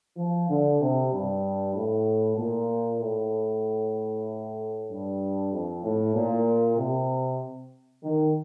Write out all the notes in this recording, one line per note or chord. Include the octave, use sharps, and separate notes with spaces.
F3
D3
C3
G2
A2
A#2
A2
G2
F2
A2
A#2
C3
D#3